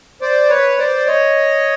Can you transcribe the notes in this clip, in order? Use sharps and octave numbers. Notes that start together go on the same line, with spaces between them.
C5 D5
B4 C#5
C5 D5
C#5 D#5